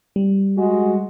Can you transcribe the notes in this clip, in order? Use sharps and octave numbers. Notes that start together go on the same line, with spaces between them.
G3
G#3 F#4